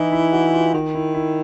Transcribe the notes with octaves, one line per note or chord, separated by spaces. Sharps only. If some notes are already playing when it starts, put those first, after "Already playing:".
Already playing: E3 D#4 E4
E4
F#4
F4
D#3
E4
E4